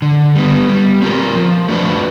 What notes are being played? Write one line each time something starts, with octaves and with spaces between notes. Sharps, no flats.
D3
G3 B3
G3
C4 F4 A#4
F3
A3 D4 F#4 B4